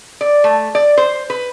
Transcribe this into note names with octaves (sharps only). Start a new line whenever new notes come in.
D5
A3
D5
C5
B4